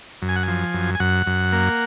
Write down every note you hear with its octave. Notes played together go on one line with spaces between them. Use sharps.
F#2
G#5
F#5
F3 G#5
F#2
G#5
F#2 F#5
F#2
A#3